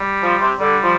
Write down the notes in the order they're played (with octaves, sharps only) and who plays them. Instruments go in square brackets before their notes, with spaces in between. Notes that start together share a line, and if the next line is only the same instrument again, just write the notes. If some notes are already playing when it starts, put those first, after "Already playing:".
Already playing: [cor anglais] G3
[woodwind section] F3
C3
[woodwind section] D3 [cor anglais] G3
[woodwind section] F3